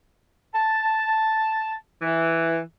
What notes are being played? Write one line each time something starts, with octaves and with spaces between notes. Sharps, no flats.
A5
E3